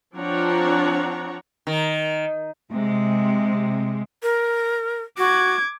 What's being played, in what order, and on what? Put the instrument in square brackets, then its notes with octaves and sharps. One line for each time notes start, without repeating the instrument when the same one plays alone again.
[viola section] F3 C4 D4 C#5 F#5 A#5
[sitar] D#3
[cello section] C3 G#3
[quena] A#4
[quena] F#4 [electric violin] D6 G#6